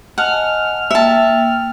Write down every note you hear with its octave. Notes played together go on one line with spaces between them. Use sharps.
D#5 F#5 G#5 A5 F6
A#3 E5 G5 A5